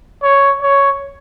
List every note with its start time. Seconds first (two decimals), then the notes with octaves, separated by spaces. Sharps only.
0.23 C#5
0.62 C#5